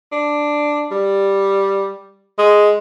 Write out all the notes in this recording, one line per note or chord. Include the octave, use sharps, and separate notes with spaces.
D4
G3
G#3